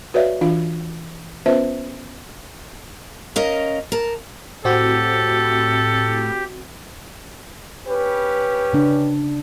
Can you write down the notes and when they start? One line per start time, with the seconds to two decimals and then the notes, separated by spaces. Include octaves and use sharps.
0.14 F#4 B4 C#5 D5 E5 F5
0.41 E3 D4 F4 F5
1.46 B3 C#4 F4 B4 C5 E5
3.36 C#4 A#4 D#5 F5
3.92 A#4 A5
4.65 A2 C4 F#4 G4 A4
7.87 C#4 G4 B4
8.73 C#3 D4